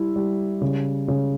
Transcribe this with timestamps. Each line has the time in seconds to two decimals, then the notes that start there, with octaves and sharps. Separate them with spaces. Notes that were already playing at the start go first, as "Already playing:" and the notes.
Already playing: G3 E4
0.16 G3
0.61 C#3
1.08 C#3